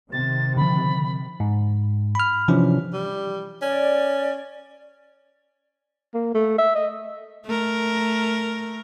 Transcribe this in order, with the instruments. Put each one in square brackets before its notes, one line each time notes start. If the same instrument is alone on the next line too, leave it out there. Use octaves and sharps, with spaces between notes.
[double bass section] C3 D#3 [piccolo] A6
[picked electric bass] D3 F3 [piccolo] B5
[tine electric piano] G#2
B5 F6
C3 E3 F3 C#4 D4 E4
[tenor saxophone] G3
[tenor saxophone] C#4 [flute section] D5
[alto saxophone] A#3
A3
E5
D#5
[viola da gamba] A3 A#4